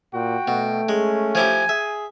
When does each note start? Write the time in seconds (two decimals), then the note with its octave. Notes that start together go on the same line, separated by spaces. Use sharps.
0.14 A#2 F#4 G5
0.48 B2 A3
0.89 G#3 C#4
1.35 F3 E4 G4 G#5
1.69 G#4 E5